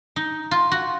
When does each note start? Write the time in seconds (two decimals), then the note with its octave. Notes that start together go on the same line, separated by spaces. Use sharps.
0.16 D#4
0.51 F4
0.72 F#4